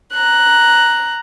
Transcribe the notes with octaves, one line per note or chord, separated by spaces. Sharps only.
A#5 F#6